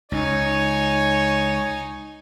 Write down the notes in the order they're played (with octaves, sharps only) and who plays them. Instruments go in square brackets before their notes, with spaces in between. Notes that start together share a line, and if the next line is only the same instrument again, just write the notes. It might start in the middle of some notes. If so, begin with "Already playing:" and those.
[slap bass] C#2 [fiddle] D#4 G#5 [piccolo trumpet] C#5